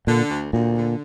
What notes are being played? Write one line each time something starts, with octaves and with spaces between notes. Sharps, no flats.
A#2 D3
D2
D2 A#2
D3